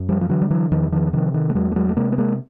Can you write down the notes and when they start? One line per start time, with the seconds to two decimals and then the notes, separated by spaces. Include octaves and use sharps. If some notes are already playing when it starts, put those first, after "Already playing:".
Already playing: F#2
0.09 F3 G3
0.21 F3
0.29 D3 E3 F#3
0.42 G3
0.50 E3 F#3
0.71 E2 D#3 F3
0.92 D#3 F3
1.13 C3 D#3 F3
1.34 D#3
1.50 A3
1.55 E2 F#3 G#3
1.72 A3
1.76 F#3 G#3
1.89 A3
1.96 C3 G#3 A#3
2.12 B3
2.18 G#3 A#3